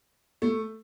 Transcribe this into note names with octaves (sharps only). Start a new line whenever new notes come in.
A3